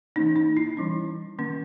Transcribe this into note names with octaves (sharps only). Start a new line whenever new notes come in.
E3 A#3 C#4 D#4
D#4
E4
E3 G3 C#4
D#3 A#3 C#4